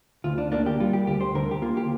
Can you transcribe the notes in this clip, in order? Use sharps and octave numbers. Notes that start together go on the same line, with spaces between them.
D2 F4
D4
A#3 D4
G4
G3 F4
G4
D2 G4
C5
D3 A#4
G4
A#3 F4
G4